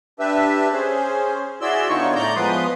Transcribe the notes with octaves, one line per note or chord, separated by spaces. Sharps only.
D4 G4 B4 E5
C#4 G#4 C5
E4 F#4 G#4 D5 C6 E6
D3 B3 D#4 F4 C#5 C#6
A2 D5 A#5 G6
F3 G#3 B3 B4 C6 D#6